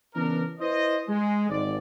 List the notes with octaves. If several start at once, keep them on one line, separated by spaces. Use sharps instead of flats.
C#3 E3 B3 C#4 D4 A#4
E4 B4 C5 D#5
G#3
G#1 D5